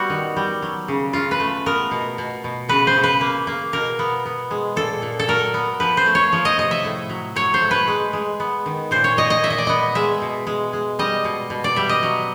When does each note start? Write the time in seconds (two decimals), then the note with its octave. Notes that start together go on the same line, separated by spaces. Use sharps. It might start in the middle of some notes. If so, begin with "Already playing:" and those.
Already playing: G3 B3 F#4
0.10 D#3
0.36 G3
0.62 F#3
0.88 C#3
1.13 C#3 F4
1.31 B4
1.40 A3
1.66 B3 A#4
1.91 B2
2.18 B2
2.44 B2
2.69 C#3 B4
2.87 C5
2.96 C#3
3.03 B4
3.21 A#3
3.47 A#3
3.73 B2 A#4
3.99 B3
4.26 B3
4.51 G#3
4.76 A#2 A4
5.02 A#2
5.19 A4
5.28 F#3 A#4
5.54 B3
5.80 F3 B4
5.97 C5
6.06 A3
6.15 C#5
6.33 F3
6.45 D#5
6.58 C3 D#5
6.71 E5
6.85 A2
7.09 F#3
7.36 F#3 C#5
7.54 C5
7.62 A3
7.71 B4
7.88 G#3
8.13 G#3
8.40 B3
8.66 D#3
8.91 A#2 C5
9.04 C#5
9.17 A#2 D#5
9.30 D#5
9.43 A#2 E5
9.50 D#5
9.58 D5
9.67 B3 D#5
9.95 G#3 E5
10.22 B2
10.47 G#3
10.73 G#3
10.99 G3 D#5
11.24 B2
11.50 B2
11.64 D5
11.76 G3 E5
11.89 D#5
12.03 F#3